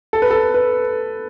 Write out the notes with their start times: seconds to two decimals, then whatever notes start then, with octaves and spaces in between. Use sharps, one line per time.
0.13 A4
0.22 B4
0.31 A4
0.54 B4